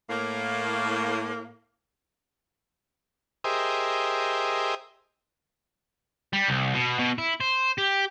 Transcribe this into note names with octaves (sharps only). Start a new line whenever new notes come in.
A2 A#3
G4 G#4 A#4 C5 D#5 E5
G3
C2
B2
B2
E4
C5
G4